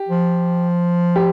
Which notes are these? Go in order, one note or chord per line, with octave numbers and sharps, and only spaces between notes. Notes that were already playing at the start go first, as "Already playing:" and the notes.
Already playing: G4
F3
G4